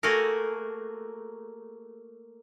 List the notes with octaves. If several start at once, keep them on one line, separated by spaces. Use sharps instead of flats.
A3 A#3 F#4 G#4 A#4